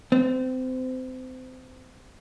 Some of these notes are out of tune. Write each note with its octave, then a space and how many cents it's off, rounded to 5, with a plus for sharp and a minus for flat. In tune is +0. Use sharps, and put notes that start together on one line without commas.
C4 -30